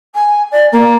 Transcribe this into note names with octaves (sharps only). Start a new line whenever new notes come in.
G#5
D5
A#3